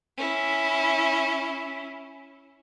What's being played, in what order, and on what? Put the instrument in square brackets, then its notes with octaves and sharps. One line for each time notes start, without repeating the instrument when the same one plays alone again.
[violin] C#4 E4